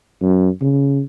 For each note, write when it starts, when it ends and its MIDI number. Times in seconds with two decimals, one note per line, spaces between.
0.22 0.49 42
0.61 1.02 49